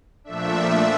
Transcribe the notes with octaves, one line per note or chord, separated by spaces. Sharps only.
A#2 F3 A3 D4 E5